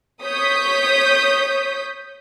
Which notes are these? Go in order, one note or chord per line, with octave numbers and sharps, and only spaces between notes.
C#5 D#6 G6 B6